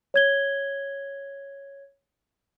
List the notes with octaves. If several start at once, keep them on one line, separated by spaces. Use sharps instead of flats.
C#5 G#6 G7